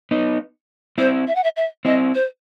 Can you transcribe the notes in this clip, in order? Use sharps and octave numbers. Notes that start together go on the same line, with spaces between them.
B3 D#4
C4 E4 C5
E5
F#5
E5
E5
C4 E4 D#5
C5